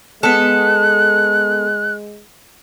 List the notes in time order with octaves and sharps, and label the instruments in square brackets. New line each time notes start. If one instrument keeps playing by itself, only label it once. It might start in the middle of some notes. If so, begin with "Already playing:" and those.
[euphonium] G#3 [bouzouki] B3 A4 [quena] F#6